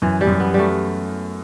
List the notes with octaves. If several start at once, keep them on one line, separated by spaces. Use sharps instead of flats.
F#2 E3
G3
F#2
B3
G3
A3